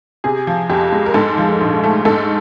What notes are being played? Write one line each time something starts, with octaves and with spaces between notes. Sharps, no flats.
C3 G#4
F3
F2 G4
G#3
A#4
G#2 A4
F3
A#1
A3
G#2 A4